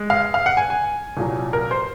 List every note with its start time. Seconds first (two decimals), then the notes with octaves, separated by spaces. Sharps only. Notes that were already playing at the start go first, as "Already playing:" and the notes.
Already playing: G#3
0.10 F5
0.34 F5
0.46 F#5
0.57 G#5
0.70 G#5
1.17 C2 A#2 F#3
1.53 A#4
1.71 C5